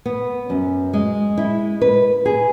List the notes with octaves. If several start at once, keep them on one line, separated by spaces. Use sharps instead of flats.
B3
F#2
G#3
E4
B4
G#4